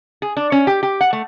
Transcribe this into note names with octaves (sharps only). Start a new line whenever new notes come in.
G#4
D4
C#4
G4
G4
F#5
A3